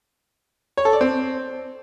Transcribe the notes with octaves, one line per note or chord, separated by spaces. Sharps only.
C#5
A4
D5
C4